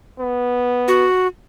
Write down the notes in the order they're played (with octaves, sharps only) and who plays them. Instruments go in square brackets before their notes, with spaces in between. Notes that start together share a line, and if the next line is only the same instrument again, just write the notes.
[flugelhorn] B3
[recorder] F#4